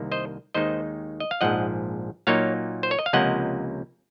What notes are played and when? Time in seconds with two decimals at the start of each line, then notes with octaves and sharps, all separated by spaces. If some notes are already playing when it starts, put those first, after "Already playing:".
Already playing: C2 C3 D#3 A#3
0.12 C5 D#5
0.54 D#2 D#3 G#3 D#4 C5 D#5
1.20 D#5
1.31 F5
1.41 A#1 G#2 F3 D#5 F#5
2.27 A#2 F#3 A#3 D#4 C#5 F5
2.83 C5
2.91 C#5
2.99 D#5
3.06 F5
3.13 C#2 C3 F3 A#3 C#4 D#5 F#5